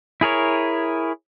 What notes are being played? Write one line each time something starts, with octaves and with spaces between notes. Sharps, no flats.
E4 G#4 A#4 C#5